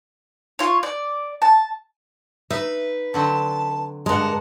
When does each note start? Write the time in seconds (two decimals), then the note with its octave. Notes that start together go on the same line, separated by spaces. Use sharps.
0.59 F4 C#5
0.83 D5
1.42 A5
2.50 D#4 B4 E5
3.14 D3 F#3 C4 A5
4.06 G2 G#3 A#4 F#5 A5